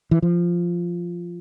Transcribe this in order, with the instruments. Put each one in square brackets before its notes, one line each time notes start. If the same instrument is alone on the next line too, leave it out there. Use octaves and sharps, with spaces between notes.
[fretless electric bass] E3
F3